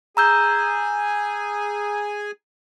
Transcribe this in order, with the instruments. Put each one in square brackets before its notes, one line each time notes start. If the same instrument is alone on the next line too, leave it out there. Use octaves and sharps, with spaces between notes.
[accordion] G#4 G#5 [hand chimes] A#5 E6 G6